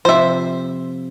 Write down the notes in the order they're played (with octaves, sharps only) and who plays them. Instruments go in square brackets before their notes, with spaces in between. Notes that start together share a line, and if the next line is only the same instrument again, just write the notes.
[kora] C3 F3 [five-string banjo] C5 E5